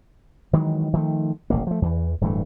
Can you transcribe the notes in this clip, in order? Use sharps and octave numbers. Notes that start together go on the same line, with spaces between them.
D#3 E3 F#3 G#3
D#3 F3 A3
D#1 A1 A#3
F3 A3
E2 E3
D1 G2 E3 A3